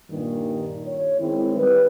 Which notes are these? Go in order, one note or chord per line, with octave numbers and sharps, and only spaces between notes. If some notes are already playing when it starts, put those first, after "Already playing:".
G2 A#2 D#3
C#5
D#3 G#3 C4 E4
G3 B4